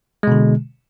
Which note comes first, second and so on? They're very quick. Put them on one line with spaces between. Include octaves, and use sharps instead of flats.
G#3 B2 D3